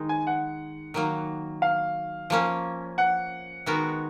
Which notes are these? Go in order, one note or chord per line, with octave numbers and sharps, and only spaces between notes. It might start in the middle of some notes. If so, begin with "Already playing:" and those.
Already playing: D#3 G#3 D#4
G#5
F#5
D#3 F#3 A#3
F5
F3 A#3 C#4
F#5
D#3 G#3 B3 F#4 A#4